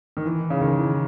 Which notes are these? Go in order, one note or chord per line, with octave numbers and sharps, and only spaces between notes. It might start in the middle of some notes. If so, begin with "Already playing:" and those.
D#3
E3
C#3
D#3
E3